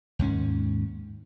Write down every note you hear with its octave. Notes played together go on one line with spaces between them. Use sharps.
D#2 G#2 C#4